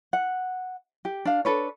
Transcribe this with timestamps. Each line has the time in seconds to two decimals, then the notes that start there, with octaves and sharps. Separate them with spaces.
0.13 F#5
1.05 G4
1.25 D4 F5
1.45 D4 A4 B4 C#5